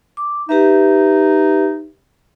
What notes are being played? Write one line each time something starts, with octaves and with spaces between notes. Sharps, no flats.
D6
D#4 G4 B4 E5